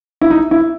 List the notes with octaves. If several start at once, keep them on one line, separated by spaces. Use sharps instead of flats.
E4
D#4
E4